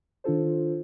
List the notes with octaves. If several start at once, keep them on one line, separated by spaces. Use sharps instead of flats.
D#3 D4 F4 A4 C5